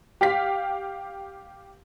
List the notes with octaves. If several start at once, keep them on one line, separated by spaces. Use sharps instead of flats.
G4 F5 B6